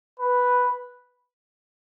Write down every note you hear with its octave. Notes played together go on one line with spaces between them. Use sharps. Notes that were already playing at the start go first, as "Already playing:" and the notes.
B4